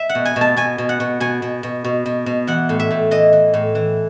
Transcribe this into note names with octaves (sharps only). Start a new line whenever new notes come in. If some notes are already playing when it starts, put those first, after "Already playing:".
Already playing: E5
F#5
B2
G#5
B2
A5
B2 G#5
B2
F#5
B2
B2 G#5
B2
B2
B2
B2
B2
E3 F#5
A2
E5
A2
E3 D#5
E3
A2
E3